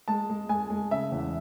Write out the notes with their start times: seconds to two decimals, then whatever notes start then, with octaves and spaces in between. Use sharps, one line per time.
0.08 G#3 A5
0.30 G#3
0.49 G#3 G#5
0.70 G#3
0.91 C#3 E5
1.12 E2